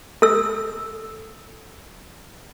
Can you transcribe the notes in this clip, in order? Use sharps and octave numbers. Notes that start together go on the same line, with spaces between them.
A4 E6